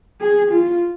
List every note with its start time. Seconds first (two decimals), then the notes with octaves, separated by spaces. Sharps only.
0.21 G#4
0.52 F4